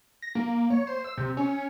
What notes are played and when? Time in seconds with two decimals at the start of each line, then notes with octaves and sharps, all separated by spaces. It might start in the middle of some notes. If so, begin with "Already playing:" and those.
0.22 A#6
0.35 A#3
0.70 C#5
0.87 C5
1.04 E6
1.17 C3
1.37 C#4